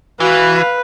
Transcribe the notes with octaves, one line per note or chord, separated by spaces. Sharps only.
E3 F#4 B4 F5